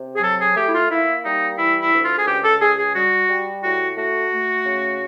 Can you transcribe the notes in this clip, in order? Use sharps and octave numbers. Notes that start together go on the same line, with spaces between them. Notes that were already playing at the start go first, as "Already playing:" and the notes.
Already playing: C3
G#4
F#3 A4
G#4
A3 G4
E4
F4
A#3 E4
G3 D#4
E3 E4
E4
D2
F4
G#4
C#2 G4
A4
C#2 G#4
G#4
G3 F#4
G3
A2 F#4
A3 F#4
A3
C#3